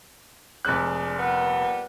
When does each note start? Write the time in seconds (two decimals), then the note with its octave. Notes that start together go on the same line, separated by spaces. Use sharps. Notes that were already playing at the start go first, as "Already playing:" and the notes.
0.65 F1 G#3 D4 F#6
1.18 A#2 G3 B3